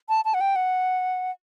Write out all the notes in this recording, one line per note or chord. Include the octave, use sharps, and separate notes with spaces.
A5
A5
F#5
G5
F#5